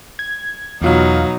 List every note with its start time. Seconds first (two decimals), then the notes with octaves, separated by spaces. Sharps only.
0.19 G#6
0.82 E2 B2 F#3 D#4 F4 F5